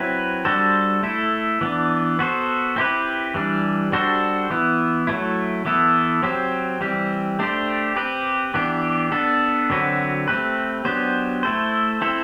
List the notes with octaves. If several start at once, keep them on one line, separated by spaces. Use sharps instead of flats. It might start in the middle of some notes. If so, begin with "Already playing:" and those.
Already playing: F#3 C4 E4 B4
G3 D4 F#4 A4 C5
A3 E4 A4
E3 B3 D4
B3 F#4 A4 C5
C4 E4 G4 B4
E3 G3 D4
G3 D4 F#4 A4 C5
E3 B3 E4
F#3 A3 E4
E3 B3 E4 A4
F#3 C4 G4 C5
E3 G3 C4 G4
A3 D4 G4 C5
C4 G4 B4
E3 B3 D4 G4
B3 D4 A4
D3 F#3 C4 F#4 B4
A3 C4 G4 B4
F#3 B3 D4 G4 C5
A3 E4 A4 C5
C4 E4 A4 C5